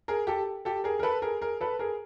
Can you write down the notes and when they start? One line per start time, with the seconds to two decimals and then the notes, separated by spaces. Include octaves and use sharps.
0.08 G#4 A#4
0.27 G4 A4
0.65 G4 A4
0.84 G#4 A#4
0.99 A#4
1.03 A4 B4
1.22 G#4 A#4
1.41 G#4 A#4
1.61 A4 B4
1.79 G#4 A#4